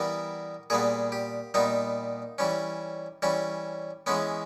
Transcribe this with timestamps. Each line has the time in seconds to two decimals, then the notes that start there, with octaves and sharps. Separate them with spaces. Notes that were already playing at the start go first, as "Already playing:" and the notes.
Already playing: E3 G3 B3 A#4
0.70 A#2 G3 B3 G#4
1.12 G4
1.54 A#2 G3 B3 D#4
2.38 E3 G3 C#4
3.22 E3 G3 C#4
4.06 E3 G#3 B3 C#4